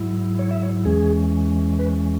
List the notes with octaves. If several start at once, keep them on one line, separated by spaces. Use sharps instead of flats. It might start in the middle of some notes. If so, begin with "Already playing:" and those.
Already playing: G#2 F#3 E4
C#5
E5
C#5
E2 E3 G#3 C#4 G#4
B4